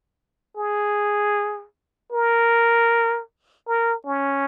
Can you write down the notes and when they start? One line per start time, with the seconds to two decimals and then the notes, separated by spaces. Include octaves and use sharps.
0.57 G#4
2.12 A#4
3.68 A#4
4.06 C#4